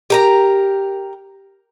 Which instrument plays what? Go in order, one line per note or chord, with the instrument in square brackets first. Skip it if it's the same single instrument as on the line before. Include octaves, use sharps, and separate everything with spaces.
[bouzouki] G4 A#4 A#5